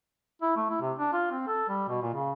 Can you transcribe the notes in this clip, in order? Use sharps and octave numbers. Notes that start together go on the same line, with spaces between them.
E4
A3
E4
C3
D4
F4
C4
A4
G3
B2
A#2
C#3